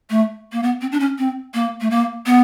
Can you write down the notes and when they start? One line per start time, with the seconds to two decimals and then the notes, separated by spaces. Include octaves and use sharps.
0.10 A3
0.52 A#3
0.63 B3
0.81 C4
0.92 D4
1.00 C#4
1.18 C4
1.54 A#3
1.81 A3
1.90 A#3
2.26 B3